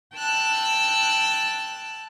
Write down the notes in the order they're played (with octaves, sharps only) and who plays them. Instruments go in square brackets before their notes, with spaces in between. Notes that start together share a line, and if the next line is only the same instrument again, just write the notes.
[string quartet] G5 A5 E6 F#6